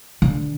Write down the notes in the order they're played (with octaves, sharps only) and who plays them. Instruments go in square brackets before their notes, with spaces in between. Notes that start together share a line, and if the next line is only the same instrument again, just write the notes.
[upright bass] D3